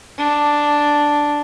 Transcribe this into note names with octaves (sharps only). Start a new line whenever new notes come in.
D4